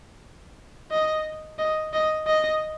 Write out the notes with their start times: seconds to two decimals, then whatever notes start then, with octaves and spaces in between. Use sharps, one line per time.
0.91 D#5
1.59 D#5
1.93 D#5
2.27 D#5